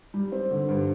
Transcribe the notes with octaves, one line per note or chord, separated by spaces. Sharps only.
G3
C4
D3
G2